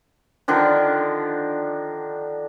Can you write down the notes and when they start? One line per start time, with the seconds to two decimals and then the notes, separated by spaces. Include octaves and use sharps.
0.48 D3 D#3 F3 D4